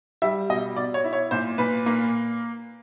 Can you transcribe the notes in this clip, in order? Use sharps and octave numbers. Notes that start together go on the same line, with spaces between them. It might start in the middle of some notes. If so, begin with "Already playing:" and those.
G3 E5
B2 D#5
B2 D5
C#5
E4
C#5
A#2 C5
A#2 B4
A#3